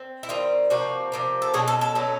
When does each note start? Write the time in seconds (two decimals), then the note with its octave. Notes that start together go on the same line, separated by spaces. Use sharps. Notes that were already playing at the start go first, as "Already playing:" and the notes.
Already playing: C4
0.23 E4
0.29 D#3 G3 C4 F4
0.70 C3 F3 A#3 F#4
1.12 C3 F3 A#3
1.42 A4
1.54 B2 F#3 A3 C#4 G#4
1.68 A4
1.81 A4
1.95 B2 F#3 A3 C#4